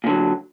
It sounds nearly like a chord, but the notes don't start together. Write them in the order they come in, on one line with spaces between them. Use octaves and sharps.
A#2 D3 F#3